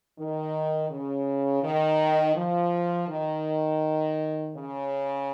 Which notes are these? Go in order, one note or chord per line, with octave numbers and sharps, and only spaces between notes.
D#3
C#3
D#3
F3
D#3
C#3